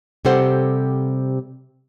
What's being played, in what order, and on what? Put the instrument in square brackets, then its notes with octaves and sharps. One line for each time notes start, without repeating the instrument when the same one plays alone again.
[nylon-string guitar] C3 G3 G4 A4 C5 F#5